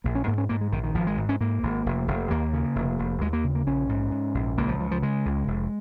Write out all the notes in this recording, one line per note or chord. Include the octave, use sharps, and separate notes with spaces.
A#1 A#3
C#4
G#2 A#3
C#4
G#2 A#3
G#3
A#1 D#3
D#3
G#1 F3
G#3
G#2
C#4
G#2 A#3
G#1
F1
F1
D#2 A#3
C#3
F1
F1
D#2 G#3
A#3
C#3
A#3
A#1 C#4
G#2
G#2
A#1
C#2 A#3
F3
C#3 F3
F3
C#3 G#3
C#2
F1